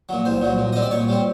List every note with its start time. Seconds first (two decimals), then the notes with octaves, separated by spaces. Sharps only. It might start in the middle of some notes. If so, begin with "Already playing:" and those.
0.09 A#2 F#3
0.25 C2 C5
0.42 A#2 F#3
0.58 A#2
0.73 G3 C4 D#5
0.82 D5
0.91 A#2 C#5
1.09 G3 C4